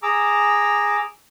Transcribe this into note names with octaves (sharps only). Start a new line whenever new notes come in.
G#4 A#5 D6 E6